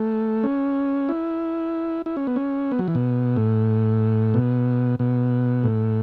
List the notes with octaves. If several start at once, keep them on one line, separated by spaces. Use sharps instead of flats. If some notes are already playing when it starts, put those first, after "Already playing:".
Already playing: A3
C#4
E4
E4
C#4
B3
C#4
B3
F#3
E3
B2
A2
B2
B2
A2